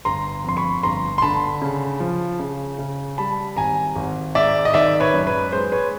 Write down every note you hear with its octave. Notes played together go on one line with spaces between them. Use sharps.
G1 A#5 C6
F2 C6
B5 C#6
G1 A#5 C6
C6
D3 A5 B5
C#3
F3
C#3
C#3
G3 A5 B5
G#1 G#5 A#5
G#1
G#2 D5 E5
D#5
D#3 D5 E5
B4 C#5
F#2
B4
G#3 C5
B4 C#5